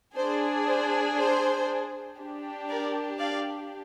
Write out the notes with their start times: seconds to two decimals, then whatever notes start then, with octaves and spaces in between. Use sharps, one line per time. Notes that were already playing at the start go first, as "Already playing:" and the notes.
0.16 D4 G#4 C5
0.67 C5
1.18 C5
2.19 D4 G4
2.69 A#4 D5
3.20 D5 F5